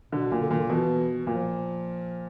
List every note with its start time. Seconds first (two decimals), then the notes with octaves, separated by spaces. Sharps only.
0.12 B2 D3
0.32 A#2
0.41 D3
0.50 A#2 D#3
0.58 D3
0.69 B2 E3
1.27 A#2 F3